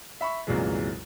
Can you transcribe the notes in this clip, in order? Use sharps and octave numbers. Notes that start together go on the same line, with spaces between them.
E5 B5 C#6
C2 F#2 A#2 E3 G#3